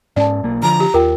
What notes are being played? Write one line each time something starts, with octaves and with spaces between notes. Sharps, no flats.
G#2 C#4 D5 A5
B1 A#3
D3 F3 A#5
G4
D#2 F4 A#4 G5